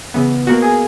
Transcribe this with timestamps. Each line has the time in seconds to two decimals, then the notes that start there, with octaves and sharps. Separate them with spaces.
0.14 C#3 E3 B3
0.47 B2 A#3 F#4
0.62 G#4